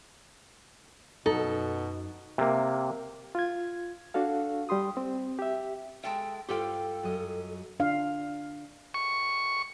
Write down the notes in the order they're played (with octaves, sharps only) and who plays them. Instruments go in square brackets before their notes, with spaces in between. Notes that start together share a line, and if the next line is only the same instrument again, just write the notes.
[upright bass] F#2 [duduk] B2 [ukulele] D#4 [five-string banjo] A4
[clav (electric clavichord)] C3 A#3
[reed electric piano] F4 G#6
D4 F#4 A4 F5
G3 G4 C6 D#6
C4
G4 E5
[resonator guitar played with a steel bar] G#3 A4 E5 [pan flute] G5
[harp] G2 F4 [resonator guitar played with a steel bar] G4 C5 G5 [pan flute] A4
[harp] F#2 D#5
[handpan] D4 F5
[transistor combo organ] C#6